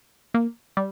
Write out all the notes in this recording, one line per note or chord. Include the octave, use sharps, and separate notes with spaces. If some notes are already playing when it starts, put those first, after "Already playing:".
A#3
G3